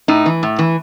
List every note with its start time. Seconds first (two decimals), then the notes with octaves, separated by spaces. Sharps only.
0.08 A2 D#4
0.26 E3
0.43 A2
0.59 E3